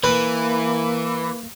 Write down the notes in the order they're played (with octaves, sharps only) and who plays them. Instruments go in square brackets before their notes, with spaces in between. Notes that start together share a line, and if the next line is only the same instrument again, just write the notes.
[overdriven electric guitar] E3 [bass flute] A#3 [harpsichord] B4